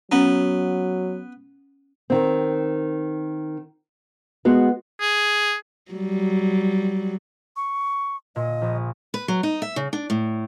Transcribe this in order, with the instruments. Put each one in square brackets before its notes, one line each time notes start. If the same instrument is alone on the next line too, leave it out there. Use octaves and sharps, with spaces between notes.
[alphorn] F#3 [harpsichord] B3 [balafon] C#4
[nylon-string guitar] D#3 C4
G#3 B3 F#4
[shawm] G#4
[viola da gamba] F#3 G3
[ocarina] C#6
[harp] A#2 [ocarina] D#5
[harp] A#1 D#6
[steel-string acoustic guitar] B4
F#3
D#4
E5
C#3
D4
A2